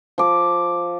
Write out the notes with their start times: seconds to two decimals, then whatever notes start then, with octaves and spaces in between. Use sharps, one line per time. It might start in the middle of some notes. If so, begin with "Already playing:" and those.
0.18 F3 D6